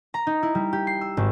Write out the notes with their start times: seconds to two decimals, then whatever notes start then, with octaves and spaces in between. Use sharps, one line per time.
0.14 A#5
0.27 D#4
0.43 E4
0.55 G3
0.73 G4
0.87 C7
1.01 E6
1.17 G#1